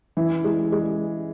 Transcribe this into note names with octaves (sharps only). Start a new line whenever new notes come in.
E3
G#3
G#3